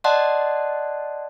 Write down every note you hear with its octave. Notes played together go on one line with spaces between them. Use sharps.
D5 D#5 F#5 A5 C6 F#6